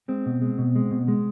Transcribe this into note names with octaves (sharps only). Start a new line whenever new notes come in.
G#3 C4
B2
G#3
B2
G#3
B2
G#3